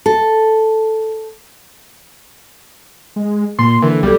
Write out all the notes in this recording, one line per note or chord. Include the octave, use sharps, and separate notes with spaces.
A4
G#3
A#2 A#3 C6
D3 E3 A#4
B1 G3 G4 A4